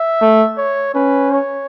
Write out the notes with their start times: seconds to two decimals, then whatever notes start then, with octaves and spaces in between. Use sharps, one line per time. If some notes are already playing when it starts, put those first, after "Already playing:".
Already playing: E5
0.21 A3
0.57 C#5
0.95 C#4 B4
1.31 C#5